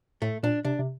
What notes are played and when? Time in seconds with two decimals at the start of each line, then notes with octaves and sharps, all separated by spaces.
0.22 A2 A3
0.43 A#2 D4
0.65 C3 D4
0.79 C3